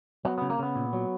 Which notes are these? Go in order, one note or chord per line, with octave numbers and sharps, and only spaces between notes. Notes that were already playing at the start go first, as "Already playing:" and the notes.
F#3 B3
C#3 B3
A#3
C#3 B3
A#2
F#3